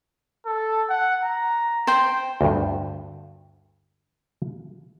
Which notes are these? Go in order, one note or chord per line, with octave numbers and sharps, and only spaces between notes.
A4
F#5
A#5
C5 G5
D2 G2